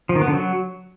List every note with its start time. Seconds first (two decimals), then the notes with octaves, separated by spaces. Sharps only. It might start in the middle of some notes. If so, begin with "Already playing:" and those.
0.09 F3
0.15 D#3
0.21 B3
0.28 D3
0.34 F#3